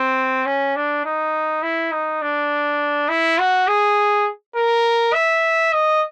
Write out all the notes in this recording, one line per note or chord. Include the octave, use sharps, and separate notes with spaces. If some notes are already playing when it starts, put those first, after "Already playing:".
Already playing: C4
C#4
D4
D#4
E4
D#4
D4
E4
F#4
G#4
A#4
E5
D#5